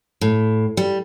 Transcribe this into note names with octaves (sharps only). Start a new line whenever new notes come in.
A2
G3